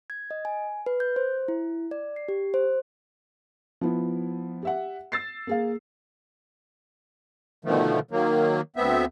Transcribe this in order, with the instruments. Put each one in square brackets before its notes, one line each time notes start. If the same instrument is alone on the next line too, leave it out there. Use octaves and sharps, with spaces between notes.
[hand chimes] G#6
D#5
G#5
B4
G6
C5
E4
D5
C7
G4
C5
[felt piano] F3 B3 E4
G4 E5 F#5
E6 A6 C7
A#3 G#4 F5
[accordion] B2 D3 D#3 F3 A3
D#3 F#3 A#3
D2 B3 C4 E5